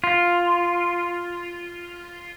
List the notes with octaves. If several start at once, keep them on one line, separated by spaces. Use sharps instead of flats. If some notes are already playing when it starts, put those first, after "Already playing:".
F4